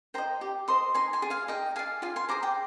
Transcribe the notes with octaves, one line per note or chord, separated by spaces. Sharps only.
C5 D#5 G5 A#5
G4
C5 D#5 C6 D#6
D#4 G#5 C6
G#5 C6
G#4 D5
F5 G#5
D#4 D#5 G5
G#4 D5 F5 G#5
F4 F5 G#5
G#5 C6
G#4 C5 A#5 D6
G5 A#5